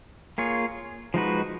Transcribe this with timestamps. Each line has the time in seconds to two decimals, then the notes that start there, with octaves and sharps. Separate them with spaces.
0.38 A#3 F4 G#4 C#5
1.14 F3 G#3 D#4 F#4 B4